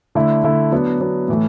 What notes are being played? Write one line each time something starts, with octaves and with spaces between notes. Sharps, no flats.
D3 A3 E4
D3 A3 E4
F#3 B3 D4
F#3 B3 D4
A2 E3 A3